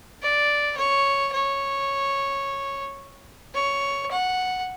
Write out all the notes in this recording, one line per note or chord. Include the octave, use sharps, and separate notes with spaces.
D5
C#5
C#5
C#5
F#5